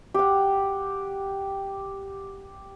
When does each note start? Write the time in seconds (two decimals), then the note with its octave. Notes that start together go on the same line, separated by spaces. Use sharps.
0.14 G4 F#5